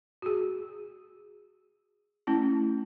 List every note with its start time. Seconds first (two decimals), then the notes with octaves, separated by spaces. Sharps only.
0.22 F#4 G#4
2.27 A3 C#4 E4 A5